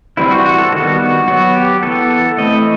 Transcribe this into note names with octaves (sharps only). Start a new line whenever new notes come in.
E3 G3 C4 E4
F#4
F#4
A4
D#3 G3 B3 F#4
F#4
F#3 B3 F#4
G4
E3 B3 A4
A4
E3 A3 C4 D#5